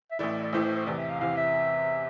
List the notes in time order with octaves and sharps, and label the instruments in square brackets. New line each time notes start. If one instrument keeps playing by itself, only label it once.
[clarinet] E5
[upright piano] A1 A2 E3 A3 E4 [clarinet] D5
[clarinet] D5
[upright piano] A1 A2 E3 A3 E4 [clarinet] C5
[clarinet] C5
C5
[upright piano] E2 C3 E3 [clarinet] D5
[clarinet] E5
F5
[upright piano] E2 C3 E3 [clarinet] F5
[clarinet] E5